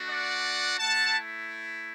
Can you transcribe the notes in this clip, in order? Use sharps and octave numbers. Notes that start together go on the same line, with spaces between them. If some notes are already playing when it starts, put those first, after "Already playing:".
Already playing: A3 D4 F#4
D5 F#5
A3 E4 F#5 A5